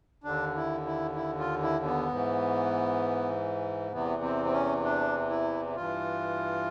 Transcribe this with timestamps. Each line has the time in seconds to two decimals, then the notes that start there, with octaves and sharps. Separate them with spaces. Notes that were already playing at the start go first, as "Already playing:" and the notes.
0.24 D#2 D3 D4
0.55 E4
0.86 E4
1.15 E4
1.39 F4
1.62 E4
1.85 B3
2.08 G#2 E3
3.92 E2 C3 E3 B3
4.23 C4
4.45 C4
4.53 C#4
4.83 D4
5.29 E4
5.76 G2 E3 F4